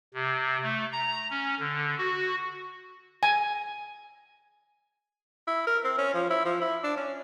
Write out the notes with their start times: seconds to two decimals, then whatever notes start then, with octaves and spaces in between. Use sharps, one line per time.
0.14 C3
0.62 A3
0.92 A#5
1.30 C#4
1.60 D3
1.98 F#4
3.23 G#5
5.48 E4
5.67 A#4
5.84 C4
5.98 C#4
6.14 F3
6.30 E4
6.45 F3
6.61 E4
6.84 D4
6.97 C#4